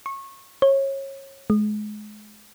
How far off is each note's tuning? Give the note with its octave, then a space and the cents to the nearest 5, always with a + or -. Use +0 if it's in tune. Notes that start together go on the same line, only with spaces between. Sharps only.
C#6 -25
C#5 -25
G#3 +30